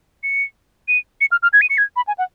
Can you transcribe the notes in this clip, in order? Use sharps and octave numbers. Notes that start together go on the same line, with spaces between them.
C#7
D#7
C#7
F6
F6
G#6
D#7
C#7
G#6
B5
G#5
F#5